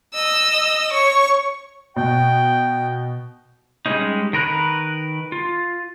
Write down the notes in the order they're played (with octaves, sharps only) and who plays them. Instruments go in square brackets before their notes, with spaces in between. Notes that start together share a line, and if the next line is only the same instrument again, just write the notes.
[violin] D#5 E6
C#5 C#6
[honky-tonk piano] B2 [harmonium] G5
[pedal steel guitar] G3 G#3 C#4 D#4
D#3 A#4 B4 F#6
F4